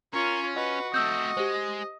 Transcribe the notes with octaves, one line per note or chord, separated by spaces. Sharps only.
C#4 F4 A#4 C#5
F#4 B4 D#5
A3 C4 D#5 E6 G6
G#3 G4 C5